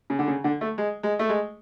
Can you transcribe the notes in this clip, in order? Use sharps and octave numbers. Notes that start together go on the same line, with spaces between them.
C#3
D3
C#3
D3
A3
G#3
G#3
A3
G#3